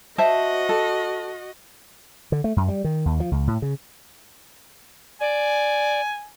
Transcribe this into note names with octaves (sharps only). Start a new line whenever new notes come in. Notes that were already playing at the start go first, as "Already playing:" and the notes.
F#4 C5 D#5 E5 A5
A4
D3
A3
F#2
G3
D#3
D#2
F3
C#2
A2
C#3
D5 G#5